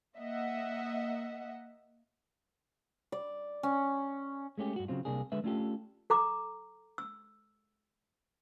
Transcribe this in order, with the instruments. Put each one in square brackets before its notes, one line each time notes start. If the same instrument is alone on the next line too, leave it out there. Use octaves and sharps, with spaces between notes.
[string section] A#3 D#5 E5 F#5
[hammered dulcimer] D5
C#4
[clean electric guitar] G#3 A3 C#4 G4
G2 F#4
C#3 F#3 C4 F4
C2 C3 A#3 D4 G#4
D3 G#3 B4 E5
A3 C#4 D4 F4 G4 A4
[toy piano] A4 A#5 D6
E6